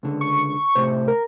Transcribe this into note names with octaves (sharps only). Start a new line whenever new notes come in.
C#2 D3
C#6
A2 C3 C5
A#4